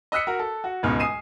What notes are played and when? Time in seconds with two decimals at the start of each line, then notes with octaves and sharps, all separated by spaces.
0.12 D#5 E6 F#6 B6 C#7
0.27 F#4 A#4
0.39 A4
0.64 F#4
0.83 D1 C#2 G#2 B2 F6
0.99 G#5 D#6 C7 D#7 E7